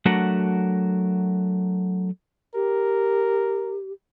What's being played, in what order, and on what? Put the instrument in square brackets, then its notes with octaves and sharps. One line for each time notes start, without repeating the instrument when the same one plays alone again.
[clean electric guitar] F#3 A3 D4 F#4 A#4 F#5
[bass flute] G4 [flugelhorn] A#4